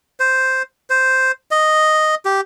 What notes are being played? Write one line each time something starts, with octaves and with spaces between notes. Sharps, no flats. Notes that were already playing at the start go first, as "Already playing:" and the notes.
C5
C5
D#5
G4